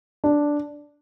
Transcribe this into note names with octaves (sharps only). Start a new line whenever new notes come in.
D4